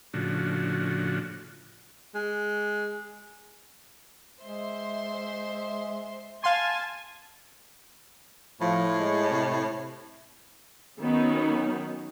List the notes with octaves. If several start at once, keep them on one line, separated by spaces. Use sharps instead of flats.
A2 C#3 F3 D4 F#4
G#3
G#3 C5 E5 C6
F5 G#5 A5 C6
A2 F3
G#3
C3
D#3 F#3 B3 C#4 D#4